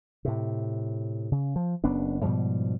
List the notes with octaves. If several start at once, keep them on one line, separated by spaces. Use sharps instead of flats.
A2 C3
C#3
F3
F#1 B3 C#4 D4
G#2 B2 F3 G3